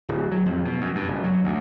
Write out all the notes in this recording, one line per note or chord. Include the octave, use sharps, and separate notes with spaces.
D1
F#3
F2
B2
F#2
G2
F#1
F#3
D2